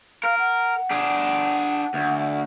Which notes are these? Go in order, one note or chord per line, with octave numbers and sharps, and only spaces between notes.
A#4 F5
F#5
D4 G#4
D2